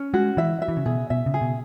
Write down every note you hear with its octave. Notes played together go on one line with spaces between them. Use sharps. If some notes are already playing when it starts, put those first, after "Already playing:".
Already playing: C#4
G#3 F#4
E3 E5
E5
E3
C#3
B2 G#4
B2 E5
C#3
G#4
B2